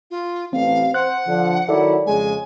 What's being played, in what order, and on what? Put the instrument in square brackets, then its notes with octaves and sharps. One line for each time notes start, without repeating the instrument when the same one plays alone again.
[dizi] F4
[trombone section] A1 [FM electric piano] C4 [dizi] F5
[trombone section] C5 [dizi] F#5 [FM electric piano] F#6
[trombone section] D3 F3
[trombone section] D#3 F#3 E4 [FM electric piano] A4 D5
[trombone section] F2 C#3 G#3 [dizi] G#5